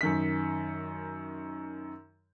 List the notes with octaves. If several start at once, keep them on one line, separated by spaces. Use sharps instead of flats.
F#2 D#3 B6